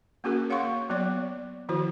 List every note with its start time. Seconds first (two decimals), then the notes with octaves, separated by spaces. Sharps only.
0.24 A#3 C#4 F#4 G#4 A#4
0.50 C#5 F5 F#5 C6 C#6
0.63 A#3
0.90 F#3 B3 C#5 D5
1.69 D#3 F3 E4 F#4 C5